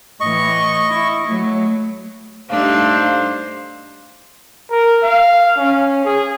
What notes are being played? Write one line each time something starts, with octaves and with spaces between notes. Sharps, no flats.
A2 E3 D#5 C#6
E4
F#3 A3
G2 A3 D4 D#4 C5 F5
A#4
F5
C#4
G#4